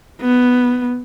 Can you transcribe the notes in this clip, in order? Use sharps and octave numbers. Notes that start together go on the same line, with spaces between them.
B3